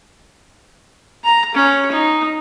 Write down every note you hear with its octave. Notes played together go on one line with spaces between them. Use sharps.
A#5
C#4
D#4